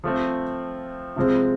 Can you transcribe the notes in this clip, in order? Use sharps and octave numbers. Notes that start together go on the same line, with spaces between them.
F3 A3 C4
C3 F3 G#3 C4